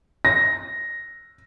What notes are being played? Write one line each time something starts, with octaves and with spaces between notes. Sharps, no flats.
A#6